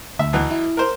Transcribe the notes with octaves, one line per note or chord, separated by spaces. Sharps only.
D2 E5
B2 E3 F#3
E4
A#4 C5